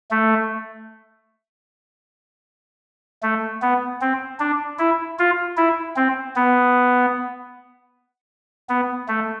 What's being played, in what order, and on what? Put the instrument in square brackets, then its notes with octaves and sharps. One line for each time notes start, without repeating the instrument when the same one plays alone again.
[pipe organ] A3
A3
B3
C4
D4
E4
F4
E4
C4
B3
B3
A3